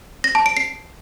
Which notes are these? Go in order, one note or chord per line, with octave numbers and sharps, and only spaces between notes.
A#6
A5
D7
C7